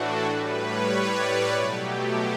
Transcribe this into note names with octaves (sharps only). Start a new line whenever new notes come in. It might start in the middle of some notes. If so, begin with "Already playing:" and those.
Already playing: A2 E3 A3 D4 F#4 A4
A2 G3 B4
C#5
D5
C#5
B2 F#3 A3 G4